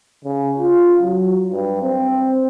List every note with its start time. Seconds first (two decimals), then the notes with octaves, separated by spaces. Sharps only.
0.25 C#3
0.59 F4
1.02 F#3
1.52 G2
1.82 C4